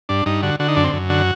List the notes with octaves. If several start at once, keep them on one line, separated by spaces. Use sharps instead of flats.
G2 D4
G2 D#4
D3 F#4
D3 F#4
D#4
F#2 D4
C4
F#2
D3 F#4